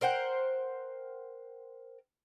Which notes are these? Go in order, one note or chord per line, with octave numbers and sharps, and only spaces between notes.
A#4 C5 F#5 G5